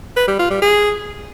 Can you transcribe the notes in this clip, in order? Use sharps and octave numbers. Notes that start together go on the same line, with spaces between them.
B4
G3
F4
G3
G#4